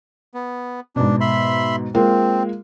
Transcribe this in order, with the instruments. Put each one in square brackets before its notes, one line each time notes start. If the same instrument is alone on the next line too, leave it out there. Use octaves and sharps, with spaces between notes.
[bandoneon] B3
[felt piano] G#2 B2 [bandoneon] D4
[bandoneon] E5 B5 C6
[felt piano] G#3 A#3 F4 [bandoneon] C4